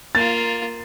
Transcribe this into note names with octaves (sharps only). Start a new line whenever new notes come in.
A#3 F4 A6